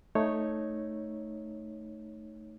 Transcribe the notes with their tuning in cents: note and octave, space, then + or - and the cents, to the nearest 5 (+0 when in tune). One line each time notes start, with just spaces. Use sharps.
A3 +0 D#4 +0 C#5 -5